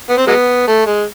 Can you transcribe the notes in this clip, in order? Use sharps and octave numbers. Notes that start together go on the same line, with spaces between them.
B3
C4
F#3 G#3 B3
A3
G#3